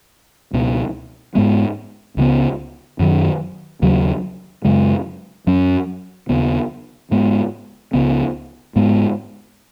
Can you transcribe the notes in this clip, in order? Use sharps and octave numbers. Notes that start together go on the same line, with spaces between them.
C#2 B2 B3
G#2 G#3 B3
C#2 C#3 F#3 B3
F#2 D#3 F#3
D#2 C#3 F#3
F#2 C#3 G#3
F#2 F#3 C#4
D#2 C#3 B3
G#2 G#3 B3
C#2 C#3 B3
G#2 G#3 B3